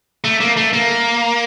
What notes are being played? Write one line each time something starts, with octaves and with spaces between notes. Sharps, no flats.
A3
A#3
A3
A#3